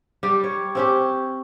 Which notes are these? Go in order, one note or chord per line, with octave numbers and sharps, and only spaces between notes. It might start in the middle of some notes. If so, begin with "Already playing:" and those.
G3 G4
C#5
C4 C#4 G4